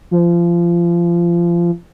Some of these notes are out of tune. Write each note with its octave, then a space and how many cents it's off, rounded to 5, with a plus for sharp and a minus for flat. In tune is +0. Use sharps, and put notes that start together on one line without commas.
F3 -25